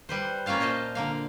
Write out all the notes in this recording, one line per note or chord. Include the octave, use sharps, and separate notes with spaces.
G3 B4 C5
A#3 C#4 F4 F5 A5
A#2 C5 D#5 A5
D3 A#3 F5